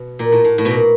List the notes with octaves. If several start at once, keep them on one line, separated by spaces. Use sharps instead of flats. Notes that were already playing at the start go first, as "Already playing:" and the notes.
Already playing: B2
A#2
A2
A2
A2
B2
A#2